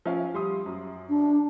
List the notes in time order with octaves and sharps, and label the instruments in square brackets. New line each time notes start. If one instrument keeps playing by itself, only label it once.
[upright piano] F3 C#4 F5
G3 C6 D#6
F#2
[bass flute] D4